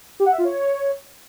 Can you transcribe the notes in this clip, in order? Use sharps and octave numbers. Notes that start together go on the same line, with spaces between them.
G4
F#5
E5
F4
C#5